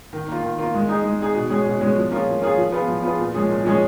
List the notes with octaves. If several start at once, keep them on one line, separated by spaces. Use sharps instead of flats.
D#3
A#3 F4
D#3
A#3 F4
G#3
D#4 G#4
G#3
D#4 G#4
B2
G#3 C#4 G#4
B2
G#3 C#4 G#4
F3
A#3 C#4 F4 G#4
F3
A#3 C#4 F4 G#4
F3
B3 F4 G#4
F3
B3 F4 G#4
A#2
F3 G#3 C#4 G#4
A#2
F3 G#3 C#4 G#4